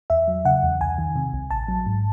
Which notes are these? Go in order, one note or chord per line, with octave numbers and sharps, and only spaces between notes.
E2 E5
F#3
C#3 F#5
E2
C2 G#5
D#3
C3
C2
A1 A5
F#3
G#2